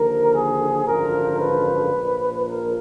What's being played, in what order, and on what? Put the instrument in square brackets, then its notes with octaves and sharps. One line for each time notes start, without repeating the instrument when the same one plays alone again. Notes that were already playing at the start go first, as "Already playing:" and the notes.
Already playing: [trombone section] D#2 D3 F3 A#4
G#4
G#1 F#2 D3 F3 A#4
B4
A#1 A#2 F3
A#4